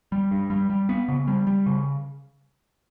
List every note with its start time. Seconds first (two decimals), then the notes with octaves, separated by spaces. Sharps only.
0.12 G3
0.31 G2
0.50 G3
0.70 G3
0.89 B3
1.08 C#3
1.28 G3
1.47 G3
1.66 C#3